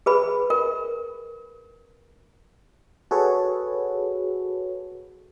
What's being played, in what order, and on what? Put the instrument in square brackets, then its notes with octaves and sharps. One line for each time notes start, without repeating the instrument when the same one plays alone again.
[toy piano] G#4 B4 B5
A#4
[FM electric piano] F#4 G#4 A4 B4 C#5